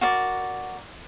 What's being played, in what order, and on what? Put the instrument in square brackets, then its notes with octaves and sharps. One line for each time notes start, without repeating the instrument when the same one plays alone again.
[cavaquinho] F#4 A#4 D5